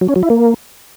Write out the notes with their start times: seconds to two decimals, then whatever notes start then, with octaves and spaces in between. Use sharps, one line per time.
0.01 F#3
0.08 C#4
0.16 F#3
0.23 E4
0.30 A#3